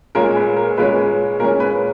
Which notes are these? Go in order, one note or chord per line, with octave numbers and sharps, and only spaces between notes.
A#2 G#3 C#4 A#4
B4
A#4
A#2 G#3 C#4 B4
A#2 G#3 C#4 A#4
B4